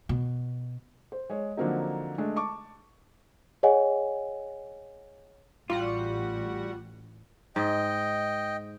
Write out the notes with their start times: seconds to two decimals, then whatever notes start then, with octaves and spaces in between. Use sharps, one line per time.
0.09 B2
1.12 C5
1.30 G#3 C#5
1.57 D3 F3 F#3 A#3 C4 D#4
2.18 G#3 A3 D4
2.36 A5 C#6 D6
3.63 G#4 C#5 D#5 F#5 G#5
5.70 A1 G3 F4 F#4 F#5
7.56 G#2 D#5 G5